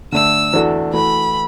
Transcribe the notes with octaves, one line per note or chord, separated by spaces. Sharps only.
D3 A3 D4 A4 E6
E2 E3 D4 F#4 A4
E3 A3 F#4 A4 B5